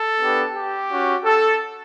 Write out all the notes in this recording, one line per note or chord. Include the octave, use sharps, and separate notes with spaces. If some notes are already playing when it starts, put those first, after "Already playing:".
Already playing: A4
B3 D4 G4
G4
C#4 F#4
A4